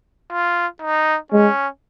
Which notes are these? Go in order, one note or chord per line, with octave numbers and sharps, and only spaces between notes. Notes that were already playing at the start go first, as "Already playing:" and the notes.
F4
D#4
G#3 C#4